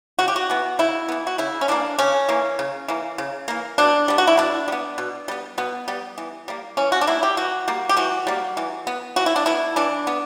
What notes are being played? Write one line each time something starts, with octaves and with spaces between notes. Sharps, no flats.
C#3 F#4
G4
F#4
E3 B3
C#3 E4
E3 B3
F#4
C#3 E4
C#4
E3 A#3 D4
C#3 C#4
E3 A#3
C#3
E3 A#3
C#3
E3 A#3
B2 D4
G3 B3
F#4
E4
B2 D4
G3
B3
B2
G3 B3
B2 B3
G3 B3
E3
G3 A#3
E3 C#4
F#4
D4
G3 A#3 E4
G4
E3 F#4
G3 A#3
G4
E3 F#4
G3 A#3
E3
B3
E3 F#4
E4
D4
B3 E4
E3 D4
B3